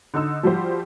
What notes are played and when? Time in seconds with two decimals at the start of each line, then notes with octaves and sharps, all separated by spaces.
0.14 D3 D#4 E6
0.43 F3 G3 F#4 G4 C5